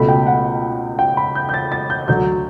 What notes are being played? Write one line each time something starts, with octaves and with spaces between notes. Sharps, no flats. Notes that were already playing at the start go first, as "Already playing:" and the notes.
Already playing: C#2 B2 A3 B5
G5
F#5
G5
B5
G6
G6
A6
A6
G6
D2 D3 F#3 G6